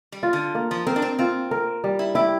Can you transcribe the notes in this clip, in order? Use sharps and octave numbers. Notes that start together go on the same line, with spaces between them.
G3
F4
D3
A#3
F3
C4 A#4
D4
C4
C4 F4
A#4
G3
E4
E4 G4